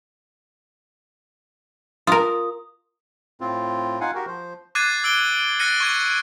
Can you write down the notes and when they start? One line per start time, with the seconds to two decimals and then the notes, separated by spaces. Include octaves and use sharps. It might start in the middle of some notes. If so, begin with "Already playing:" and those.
2.07 F4 A#4 D#6
3.41 A2 C4 F4
4.01 D#4 F4 F5 F#5 G#5
4.14 F#4 G4 A#4
4.27 F3 C5
4.75 D6 F#6 G#6 A6 C7 D#7
5.04 E6 D7 G7
5.60 F6 F#6 A6 A#6 C#7 D#7
5.80 C#6 G#6 D#7